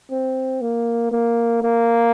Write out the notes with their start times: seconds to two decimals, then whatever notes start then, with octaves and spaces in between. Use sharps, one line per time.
0.11 C4
0.62 A#3
1.12 A#3
1.62 A#3